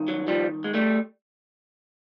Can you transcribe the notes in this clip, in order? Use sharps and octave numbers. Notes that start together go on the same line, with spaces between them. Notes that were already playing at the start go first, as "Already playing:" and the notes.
Already playing: G2 D#3
F#3
F3 G3
G#3
G3 A3